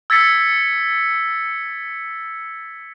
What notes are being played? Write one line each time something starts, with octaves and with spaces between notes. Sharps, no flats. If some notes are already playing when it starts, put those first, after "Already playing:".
E6 G#6 A6 B6 C#7